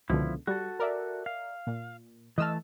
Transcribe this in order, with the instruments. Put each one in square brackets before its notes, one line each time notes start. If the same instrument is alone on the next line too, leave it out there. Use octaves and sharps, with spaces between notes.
[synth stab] C#2 B2 D3 [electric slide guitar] F3 E4
[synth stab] G3 [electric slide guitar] F#4 A4
[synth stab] A#4 D5 E5
[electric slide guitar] F5
[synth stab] A#2
[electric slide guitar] E3 A3 A5 [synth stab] D#5 E6 F6